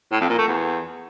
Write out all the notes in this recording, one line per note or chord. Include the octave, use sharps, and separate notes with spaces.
A2
F2
A#2
A3
E2